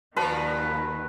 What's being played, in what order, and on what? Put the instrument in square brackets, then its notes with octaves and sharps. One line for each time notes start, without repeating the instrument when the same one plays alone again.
[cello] D#2 D#3 [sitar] A#2 F3 F#3 [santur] B4 [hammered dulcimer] A5